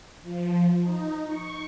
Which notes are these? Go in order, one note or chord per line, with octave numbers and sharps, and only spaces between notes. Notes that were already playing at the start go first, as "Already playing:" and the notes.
F3
D#4
C#6